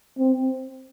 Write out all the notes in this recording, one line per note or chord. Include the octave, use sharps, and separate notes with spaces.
C4